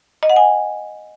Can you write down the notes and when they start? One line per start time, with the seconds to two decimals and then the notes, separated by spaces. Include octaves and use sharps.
0.23 D#5
0.30 F#5
0.36 G#5